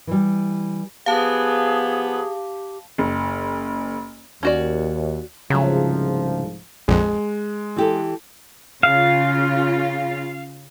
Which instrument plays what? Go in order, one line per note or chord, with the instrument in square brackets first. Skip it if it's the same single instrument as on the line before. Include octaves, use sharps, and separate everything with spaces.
[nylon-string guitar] E3 G3
[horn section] F3 B3 [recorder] G4 [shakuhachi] G#4 [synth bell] F5 A5
[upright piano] F#1
[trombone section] D#2 [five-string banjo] C#4 F#4 D5
[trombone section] C2 G#2 F3 [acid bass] C#3 [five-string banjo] F#3 A3
[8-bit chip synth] A#1 F2 [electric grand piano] G#3
[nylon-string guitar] E3 G4 A4
[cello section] C#3 F4 [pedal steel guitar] F5